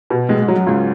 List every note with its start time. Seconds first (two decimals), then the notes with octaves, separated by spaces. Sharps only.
0.10 B2
0.29 A2 G#3
0.42 G#2
0.48 F#3
0.56 F#2
0.67 C#2 G#2